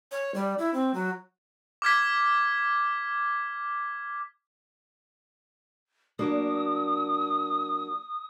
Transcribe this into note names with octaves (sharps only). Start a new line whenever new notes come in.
C#5
G3
E4
C4
F#3
D6 F6 G#6 B6
F#3 A#3 D4 D#6